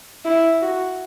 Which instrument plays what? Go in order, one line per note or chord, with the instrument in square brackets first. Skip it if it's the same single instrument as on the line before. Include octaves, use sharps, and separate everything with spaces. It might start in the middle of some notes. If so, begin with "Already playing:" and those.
[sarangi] E4
F#4